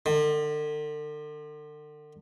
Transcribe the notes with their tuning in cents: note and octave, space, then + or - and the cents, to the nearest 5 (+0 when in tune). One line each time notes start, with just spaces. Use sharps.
D3 +40